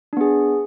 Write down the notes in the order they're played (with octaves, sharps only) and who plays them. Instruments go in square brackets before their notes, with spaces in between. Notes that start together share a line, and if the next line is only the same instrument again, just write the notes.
[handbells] D4
B3
G#4